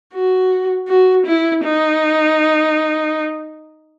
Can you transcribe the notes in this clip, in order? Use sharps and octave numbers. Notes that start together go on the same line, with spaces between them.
F#4
F#4
E4
D#4